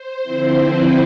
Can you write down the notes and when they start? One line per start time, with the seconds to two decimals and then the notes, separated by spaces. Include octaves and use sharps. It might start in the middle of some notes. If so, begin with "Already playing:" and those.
Already playing: C5
0.23 D3 F3 C4 E4
0.57 B4